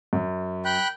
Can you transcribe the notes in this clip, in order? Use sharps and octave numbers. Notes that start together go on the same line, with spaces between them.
F#2
G5 B5 F#6